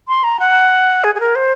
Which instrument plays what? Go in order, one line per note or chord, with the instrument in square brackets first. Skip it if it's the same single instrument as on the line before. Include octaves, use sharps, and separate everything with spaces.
[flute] C6
A#5
F#5
G#4
G#4
A#4
C5